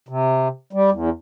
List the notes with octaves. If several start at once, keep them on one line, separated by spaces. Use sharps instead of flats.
C3
G3
E2